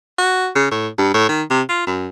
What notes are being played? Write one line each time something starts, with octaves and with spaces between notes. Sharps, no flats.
F#4
C#3
A2
G2
A2
D#3
C3
F4
F#2